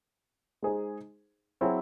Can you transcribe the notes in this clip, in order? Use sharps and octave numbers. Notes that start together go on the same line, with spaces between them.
G#3 D#4 G#4 C5
F#3 C4 E4 G#4 C#5